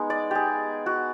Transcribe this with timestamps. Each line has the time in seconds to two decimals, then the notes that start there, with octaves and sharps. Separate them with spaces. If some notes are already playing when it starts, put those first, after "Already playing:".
Already playing: G#3 B3 D#4
0.10 D5
0.31 G4 G#4
0.86 F#4